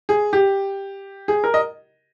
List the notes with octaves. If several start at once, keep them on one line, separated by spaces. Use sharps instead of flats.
G#4
G4
G#4
A#4
D#5